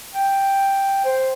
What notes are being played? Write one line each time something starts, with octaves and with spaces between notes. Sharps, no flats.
G5
C5